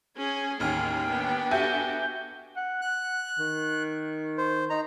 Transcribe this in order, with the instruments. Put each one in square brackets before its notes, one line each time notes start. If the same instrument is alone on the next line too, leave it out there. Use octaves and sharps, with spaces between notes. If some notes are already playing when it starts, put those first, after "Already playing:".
[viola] C#4 G#4 [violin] G#5
[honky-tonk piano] A1 D#2 [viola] C#4 [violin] G5 G#5 [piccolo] F6
[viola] B3 D4
[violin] F#4 A4 [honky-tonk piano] G4 E5 G#5 [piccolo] G6
[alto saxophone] F#5
[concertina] F#6
[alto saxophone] D#3
[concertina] C5
D#4 A#5